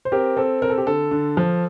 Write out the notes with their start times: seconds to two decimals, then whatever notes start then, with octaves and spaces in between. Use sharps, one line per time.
0.05 C5
0.12 C4 G4 A#4
0.37 C4 A4
0.62 C4 A#4
0.70 A4
0.78 G4
0.86 D3 A4
1.11 D3
1.37 F3